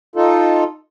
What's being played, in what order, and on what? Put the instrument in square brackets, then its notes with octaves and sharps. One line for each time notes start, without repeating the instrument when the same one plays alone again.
[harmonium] D#4 F4 A4